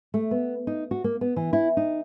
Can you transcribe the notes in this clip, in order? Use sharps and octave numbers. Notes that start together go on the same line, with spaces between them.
A3
B3
D#4
F#4
A#3
B3
E3
E4
D#4